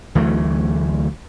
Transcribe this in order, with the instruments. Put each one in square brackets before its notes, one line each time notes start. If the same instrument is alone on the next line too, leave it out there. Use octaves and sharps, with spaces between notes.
[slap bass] D2 E3 F#3 A3